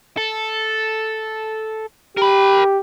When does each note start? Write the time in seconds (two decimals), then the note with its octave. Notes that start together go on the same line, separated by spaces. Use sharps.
0.17 A4
2.17 G4 A#4 B5